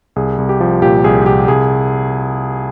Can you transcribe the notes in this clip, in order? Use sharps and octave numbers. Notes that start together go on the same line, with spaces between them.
C2 G#4
C2
G4
F3
A#2 G4
C2 G#4
C2 G4
C2 G#4